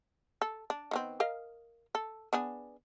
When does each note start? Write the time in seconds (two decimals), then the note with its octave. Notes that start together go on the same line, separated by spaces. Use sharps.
0.42 A4
0.70 D4
0.91 D#3 B3 C4
1.20 A#4 D#5 F5
1.95 A4
2.33 B3 D4 G#4